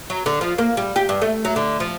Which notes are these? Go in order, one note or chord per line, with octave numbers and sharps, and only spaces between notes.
F#3
D3
F3
A#3
G3
G4
G2
A3
F#3
D3
F3